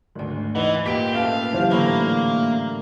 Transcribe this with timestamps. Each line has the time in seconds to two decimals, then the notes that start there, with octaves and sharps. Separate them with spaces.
0.16 G#1 D2 G#2 D5
0.55 E3 D#4 B4 D#5 F#5
0.86 A#2 G4 B6 D7
1.14 A3 C#4 B4 E5 F5 A5
1.53 E3 F#3 G4 C5
1.71 A2 D3 A#3 F5 B5 C#6